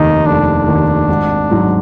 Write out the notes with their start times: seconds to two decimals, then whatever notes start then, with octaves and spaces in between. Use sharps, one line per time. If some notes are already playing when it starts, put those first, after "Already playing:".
Already playing: F1 D#2 D#3 D#4
0.26 F1 D4
0.68 D#2 D#3
1.09 G#1
1.50 G#2 F#3